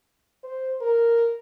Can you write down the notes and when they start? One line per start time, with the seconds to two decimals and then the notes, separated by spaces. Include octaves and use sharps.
0.44 C5
0.81 A#4